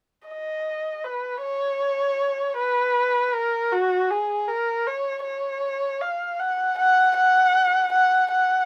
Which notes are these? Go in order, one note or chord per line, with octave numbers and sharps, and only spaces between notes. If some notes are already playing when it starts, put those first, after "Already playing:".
D#5
B4
C#5
B4
A#4
F#4
G#4
A#4
C#5
C#5
F5
F#5
F#5
F#5
F#5
F#5